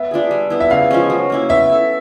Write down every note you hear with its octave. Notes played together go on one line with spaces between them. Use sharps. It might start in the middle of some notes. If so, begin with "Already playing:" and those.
Already playing: B3 E5
D4 F4 G#4
G3
B3 E4
E5
C#3 F5
F3 G#3 C#4
F#3
A#3 C#4 E4
B3 E5
E4 A4